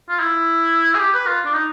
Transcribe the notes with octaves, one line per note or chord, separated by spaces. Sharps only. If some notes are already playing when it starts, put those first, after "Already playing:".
F4
E4
G#4
G4
B4
F4
D4
D#4